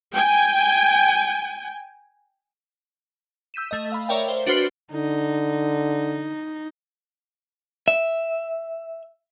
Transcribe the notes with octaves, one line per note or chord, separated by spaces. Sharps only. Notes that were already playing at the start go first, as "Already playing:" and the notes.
G5 G#5
E6 G6 B6 D#7 E7
A3 D#5
F5 B5
A#4 C#5 D5 E5 G5
C5
D4 F#4 B4 C5 F6 C7
D3 D#4
E5